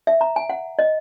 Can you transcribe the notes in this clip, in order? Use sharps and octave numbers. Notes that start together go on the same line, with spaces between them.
E5
A#5
G#5
F#5
D#5